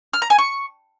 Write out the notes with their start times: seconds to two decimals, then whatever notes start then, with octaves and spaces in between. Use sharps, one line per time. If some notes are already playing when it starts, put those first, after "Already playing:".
0.13 F6
0.22 A#5
0.30 G#5
0.38 C#6